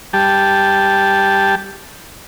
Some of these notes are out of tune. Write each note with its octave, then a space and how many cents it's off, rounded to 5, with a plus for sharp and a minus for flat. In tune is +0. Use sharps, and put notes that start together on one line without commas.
G3 +0 G4 +0 A5 -5